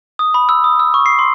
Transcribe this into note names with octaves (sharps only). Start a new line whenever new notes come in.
D#6
B5
E6
D#6
E6
C#6
C7
C6